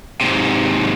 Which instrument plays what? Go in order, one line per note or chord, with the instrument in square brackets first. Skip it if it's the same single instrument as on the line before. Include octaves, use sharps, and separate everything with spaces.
[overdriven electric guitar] G#2 C3